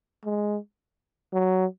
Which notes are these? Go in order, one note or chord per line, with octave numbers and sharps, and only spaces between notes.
G#3
F#3